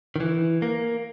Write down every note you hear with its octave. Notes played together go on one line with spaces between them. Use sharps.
D#3
E3
A#3